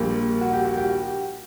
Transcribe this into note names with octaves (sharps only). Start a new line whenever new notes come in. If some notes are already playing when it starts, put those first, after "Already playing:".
Already playing: A#1 A#2 G3 A#3 G4
F#4
G4
F#4
G4